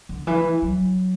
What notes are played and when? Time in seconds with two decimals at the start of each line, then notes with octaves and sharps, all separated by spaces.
0.09 D3
0.27 E3
0.62 F#3